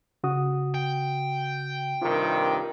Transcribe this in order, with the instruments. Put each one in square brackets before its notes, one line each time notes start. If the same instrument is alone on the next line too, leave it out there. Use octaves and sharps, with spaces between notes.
[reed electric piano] C#3 F#4 D#6
[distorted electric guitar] G5
[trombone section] G2 C3 D#3 [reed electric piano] F4 A#4